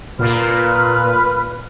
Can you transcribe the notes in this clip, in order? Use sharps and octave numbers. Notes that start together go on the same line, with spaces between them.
A#2 B4 F6